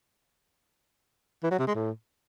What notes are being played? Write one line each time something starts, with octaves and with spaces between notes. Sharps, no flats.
E3
F#3
C3
G#3
A2